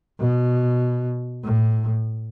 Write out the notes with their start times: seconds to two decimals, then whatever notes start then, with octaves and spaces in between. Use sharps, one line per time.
0.20 B2
1.43 A2